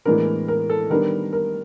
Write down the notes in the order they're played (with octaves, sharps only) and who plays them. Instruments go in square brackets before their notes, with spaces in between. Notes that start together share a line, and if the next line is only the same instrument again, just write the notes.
[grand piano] A2 E3 G#3 B3 D4 A#4
A#4
A4
D#3 G3 B3 D4 A#4
A#4